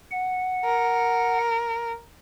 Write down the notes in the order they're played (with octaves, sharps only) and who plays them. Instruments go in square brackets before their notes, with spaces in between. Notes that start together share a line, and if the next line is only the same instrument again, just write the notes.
[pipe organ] F#5
[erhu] A#4